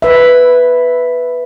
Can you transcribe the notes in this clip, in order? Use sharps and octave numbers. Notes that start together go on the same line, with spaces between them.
B4 E5